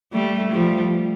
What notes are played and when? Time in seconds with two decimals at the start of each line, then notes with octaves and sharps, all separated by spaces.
0.12 G3 A3
0.52 F3 G3